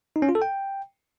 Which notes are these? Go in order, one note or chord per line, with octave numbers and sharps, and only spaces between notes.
D#4
C#4
F4
A4
G5